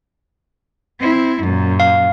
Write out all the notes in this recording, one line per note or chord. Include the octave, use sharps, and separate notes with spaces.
C4 E4
F#2 A#2
F5